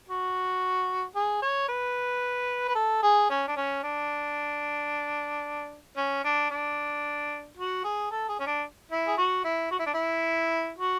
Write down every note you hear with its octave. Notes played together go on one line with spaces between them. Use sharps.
F#4
G#4
C#5
B4
B4
A4
G#4
C#4
D4
C#4
D4
C#4
D4
D4
F#4
G#4
A4
G#4
C#4
D4
E4
G#4
F#4
E4
F#4
E4
D4
E4
F#4